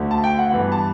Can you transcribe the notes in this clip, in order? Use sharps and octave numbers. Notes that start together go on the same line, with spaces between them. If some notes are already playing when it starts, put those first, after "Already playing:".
Already playing: D2 D3 A3
A5
G5
F#5
G2 E3 B3
A5